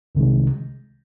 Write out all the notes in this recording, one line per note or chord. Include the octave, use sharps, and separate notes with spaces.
C2 C3 D#3 G#3